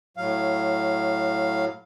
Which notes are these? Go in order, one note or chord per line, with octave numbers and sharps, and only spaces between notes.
A2 F#3 F5